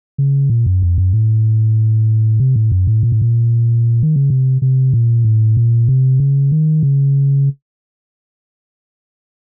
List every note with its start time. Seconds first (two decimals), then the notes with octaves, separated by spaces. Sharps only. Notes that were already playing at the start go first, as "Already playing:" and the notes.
0.18 C#3
0.50 A#2
0.66 F#2
0.82 F2
0.98 F#2
1.13 A2
2.40 C3
2.56 A2
2.72 F#2
2.87 A2
3.03 A#2
3.12 A2
3.22 A#2
4.02 D#3
4.16 C#3
4.30 C3
4.62 C3
4.94 A#2
5.24 A2
5.57 A#2
5.88 C3
6.20 C#3
6.52 D#3
6.83 C#3